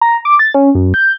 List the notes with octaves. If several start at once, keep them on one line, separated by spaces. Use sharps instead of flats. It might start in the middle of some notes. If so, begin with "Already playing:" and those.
A#5
D6
A6
C#4
F#2
G6